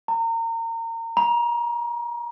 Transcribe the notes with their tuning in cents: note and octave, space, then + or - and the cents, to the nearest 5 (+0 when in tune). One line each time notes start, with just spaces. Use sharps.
A#5 -30
A#5 +30